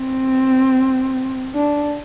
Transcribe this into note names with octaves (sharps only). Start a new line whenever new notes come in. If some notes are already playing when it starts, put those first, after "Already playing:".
Already playing: C4
D4